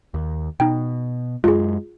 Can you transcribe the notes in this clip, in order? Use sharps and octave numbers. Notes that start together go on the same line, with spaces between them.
D#2
B2 D#4 G5
F#2 G#3 F4 G#4